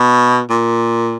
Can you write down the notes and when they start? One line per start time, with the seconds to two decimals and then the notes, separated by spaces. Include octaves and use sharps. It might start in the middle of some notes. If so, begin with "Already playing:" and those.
Already playing: B2
0.50 A#2